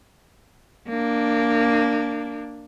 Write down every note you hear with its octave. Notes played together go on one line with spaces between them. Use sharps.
A#3 D4